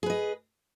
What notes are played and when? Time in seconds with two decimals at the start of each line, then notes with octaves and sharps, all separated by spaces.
0.03 G#4
0.06 B4
0.10 D#5